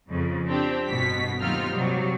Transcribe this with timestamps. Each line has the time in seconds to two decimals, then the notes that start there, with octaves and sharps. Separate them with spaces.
0.11 F2 C#3
0.47 C4 D4 G4
0.88 G1 B2 B6
1.40 D#2 F#3 C4 D#4 F4 F6
1.71 C3 F#3 G3